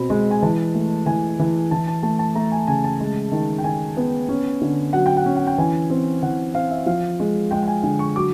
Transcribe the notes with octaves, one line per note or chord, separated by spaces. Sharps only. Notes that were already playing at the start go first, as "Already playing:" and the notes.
Already playing: B2 C4 B5
G#3
G#5
E3 A5
A3
E3 G#5
E3
E3 A5
A5
A3 A5
A5
A3 A#5
G#5
C#3 G#5
A5
G#3
D#3
G5
D#3 G#5
B3
C#4
D3
F#3 F#5
G5
F#5
C#4
F#5
G5
E3 G#5
C4
E3 F#5
C4 F5
E5
F3 F5
G#3
G#3 G5
G5
G#5
D3 G#5
C#6
F#3 D6